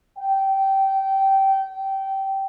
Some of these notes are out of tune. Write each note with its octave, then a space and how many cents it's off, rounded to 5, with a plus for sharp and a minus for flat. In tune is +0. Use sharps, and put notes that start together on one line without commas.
G5 -20